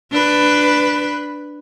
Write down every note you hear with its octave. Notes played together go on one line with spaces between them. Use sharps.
D4 B4